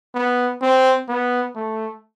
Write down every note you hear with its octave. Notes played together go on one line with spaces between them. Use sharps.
B3
C4
B3
A3